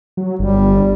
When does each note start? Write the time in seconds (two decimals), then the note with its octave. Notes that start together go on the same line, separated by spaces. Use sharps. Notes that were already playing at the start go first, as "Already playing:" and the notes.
0.17 F#3
0.39 G1 G3